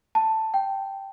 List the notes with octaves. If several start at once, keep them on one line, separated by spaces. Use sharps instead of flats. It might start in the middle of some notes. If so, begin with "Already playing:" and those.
A5
G5